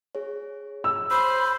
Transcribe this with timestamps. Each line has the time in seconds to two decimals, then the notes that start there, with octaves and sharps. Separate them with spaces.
0.15 G#4 C#5
0.84 E6
1.11 C5 B5